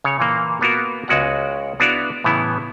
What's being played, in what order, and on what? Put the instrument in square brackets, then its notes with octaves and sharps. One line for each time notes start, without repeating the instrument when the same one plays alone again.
[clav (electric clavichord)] C#3 C#5
A#2 E3 A#3
A#3 B3 F4 F#4 A#4
C#2 G#3 C#4 F#4 D5 F#5
B3 D4 E4 F#4 D5 F5
A2 C#3 E3 B3 E4